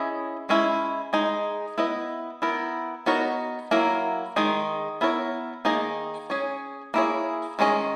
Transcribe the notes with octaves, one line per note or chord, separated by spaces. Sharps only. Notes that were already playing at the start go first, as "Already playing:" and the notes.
Already playing: C#4 E4 G#4 D#5
G#3 C#4 E4
G#3 D#4 G#4
B3 E4 B4 D#5
B3 E4 A#4
B3 D#4 F#4 A#4 C#5
F#3 A#3 E4 A#4
D#3 G#3 D#4 G#4
B3 E4 A#4 C#5
D#3 A#3 D#4 G#4 D#5
C#4 G#4 C#5
A#3 E4 G#4 C#5
D#3 G#3 C#4 G#4 D#5